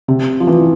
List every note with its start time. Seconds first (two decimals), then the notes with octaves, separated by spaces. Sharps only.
0.08 C3
0.40 F3
0.47 E3